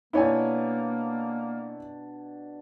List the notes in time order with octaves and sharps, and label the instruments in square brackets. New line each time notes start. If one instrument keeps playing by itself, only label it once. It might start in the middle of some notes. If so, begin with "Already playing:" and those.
[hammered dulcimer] B2 D4 [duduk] A#3 [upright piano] E4 C#5 G#5